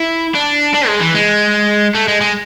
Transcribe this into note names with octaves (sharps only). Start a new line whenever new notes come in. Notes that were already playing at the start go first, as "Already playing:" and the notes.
Already playing: E4
D4
D4
G#3
E3
G#3
A3
G#3
G#3